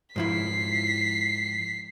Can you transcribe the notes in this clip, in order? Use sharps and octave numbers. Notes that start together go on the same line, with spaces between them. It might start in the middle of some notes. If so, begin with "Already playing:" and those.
G#2 F3 E4 B6 C7